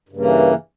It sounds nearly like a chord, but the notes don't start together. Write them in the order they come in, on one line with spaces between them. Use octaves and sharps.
G2 C#3 A#3 E3